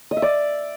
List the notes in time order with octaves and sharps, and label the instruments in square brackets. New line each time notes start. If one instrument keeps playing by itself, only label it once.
[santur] D#5
E5
D5